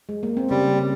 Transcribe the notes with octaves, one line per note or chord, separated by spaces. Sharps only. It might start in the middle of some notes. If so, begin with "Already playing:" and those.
G#3
A#3
C4
C#3 G3 C#4